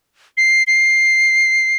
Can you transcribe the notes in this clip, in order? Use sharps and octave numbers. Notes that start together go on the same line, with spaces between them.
C7
C7